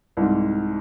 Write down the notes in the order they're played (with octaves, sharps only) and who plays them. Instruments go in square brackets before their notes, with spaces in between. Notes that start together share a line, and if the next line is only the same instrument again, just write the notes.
[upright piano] C2 G#2